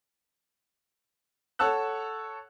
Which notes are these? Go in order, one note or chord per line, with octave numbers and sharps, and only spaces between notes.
A4 C#5 F#5 A5 E6 F#6